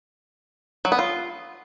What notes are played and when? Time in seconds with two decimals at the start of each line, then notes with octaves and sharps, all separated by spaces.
0.85 F#3
0.92 B3
0.99 F4